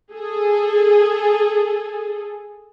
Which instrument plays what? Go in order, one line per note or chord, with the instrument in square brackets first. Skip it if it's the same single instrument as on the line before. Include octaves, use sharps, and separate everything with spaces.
[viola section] G#4 A4